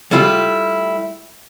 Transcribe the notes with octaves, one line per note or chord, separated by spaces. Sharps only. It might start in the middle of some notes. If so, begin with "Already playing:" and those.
G3 A3 E4 F4 G4